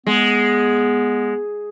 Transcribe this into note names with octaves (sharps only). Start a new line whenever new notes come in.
G#3 B3